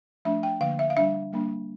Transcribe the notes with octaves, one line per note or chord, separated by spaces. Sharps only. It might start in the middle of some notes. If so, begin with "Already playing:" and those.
F3 A3 D4 E5
G5
D3 F3 A#3 F5
E5
F5
G3 D4 E5
G3 A#3 D4